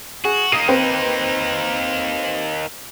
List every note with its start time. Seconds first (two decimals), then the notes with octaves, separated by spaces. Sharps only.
0.25 F#4 G#4
0.52 A#3 D#4 D#6 C7 D#7
0.68 C4 B4 G5